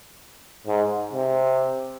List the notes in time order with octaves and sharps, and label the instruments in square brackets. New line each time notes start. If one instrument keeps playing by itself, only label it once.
[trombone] G#2
C3